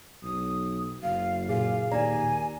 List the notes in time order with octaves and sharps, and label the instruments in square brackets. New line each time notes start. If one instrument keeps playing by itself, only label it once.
[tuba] B1 [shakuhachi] D#6
[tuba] F#1 [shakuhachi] F5
[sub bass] A#2 [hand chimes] G#4 [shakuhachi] F5
[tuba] D#2 [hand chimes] D5 A#5 [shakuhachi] G#5